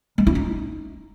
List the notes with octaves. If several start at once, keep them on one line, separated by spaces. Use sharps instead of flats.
G#3
E4
D#4